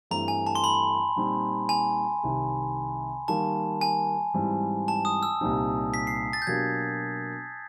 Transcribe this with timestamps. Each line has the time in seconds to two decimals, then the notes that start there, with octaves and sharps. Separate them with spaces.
0.11 G2 E3 A3 C4 A#5
0.28 G#5
0.47 A5
0.55 C6
0.64 B5
1.16 A#2 G3 C4 D#4
1.69 G#5
2.23 C2 C3 D#3
3.28 D#3 G3 A#3 A5
3.81 G#5
4.34 G#2 E3 G3 C4
4.88 A5
5.05 D#6
5.23 E6
5.41 C2 A#2 G3 C4 D#4
5.94 B6
6.07 C7
6.33 A6
6.42 G6
6.47 B2 F#3 A#3 D4 G4 G#6